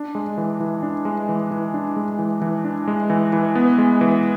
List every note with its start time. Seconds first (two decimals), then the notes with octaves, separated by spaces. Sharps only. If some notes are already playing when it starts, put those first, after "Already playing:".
Already playing: D4
0.15 G#3
0.38 E3
0.60 E3
0.83 D4
1.05 G#3
1.29 E3
1.51 E3
1.74 D4
1.96 G#3
2.19 E3
2.42 E3
2.64 D4
2.88 G#3
3.10 E3
3.33 E3
3.55 B3
3.78 G#3
4.01 E3